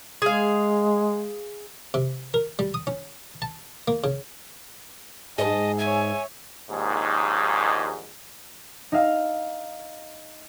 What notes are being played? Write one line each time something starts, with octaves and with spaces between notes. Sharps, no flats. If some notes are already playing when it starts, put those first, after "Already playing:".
G#3 G#4 F5
C3
A#4
G3
D#6
C#4
A5
A#3
C#3
G#2 G#4 D#5 A5
C#5 E5 G#5
A#1 D#2 G#2
D#4 E5 F5